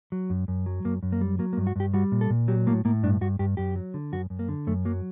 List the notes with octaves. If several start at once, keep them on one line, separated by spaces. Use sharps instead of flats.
F#3
F#2
F#2
F#3
F#2 A#3
F#2
A#3
G3
F#3 A#3
A#3
G2
F#4
G2 G4
G3 F#4
A#2
A4
A#2
F#3 G4
A2 A#3
A2 A#3
G2 D4
G2 F#4
G2 G4
F#2 G4
F#3
D3
F#2 F#4
F#2
A#3
D3
F#2 A3
F#3 A#3